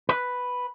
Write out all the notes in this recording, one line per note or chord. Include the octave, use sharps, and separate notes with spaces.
B4